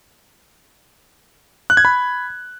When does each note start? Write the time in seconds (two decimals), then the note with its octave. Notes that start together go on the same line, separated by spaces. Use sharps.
1.70 F#6
1.77 G#6
1.85 B5